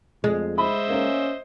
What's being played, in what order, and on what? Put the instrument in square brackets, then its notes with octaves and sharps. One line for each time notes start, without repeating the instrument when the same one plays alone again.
[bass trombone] F2 [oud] G#3
[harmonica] C5 D#5 E5 [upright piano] B5
[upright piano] A#3 A#4 [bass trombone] C#4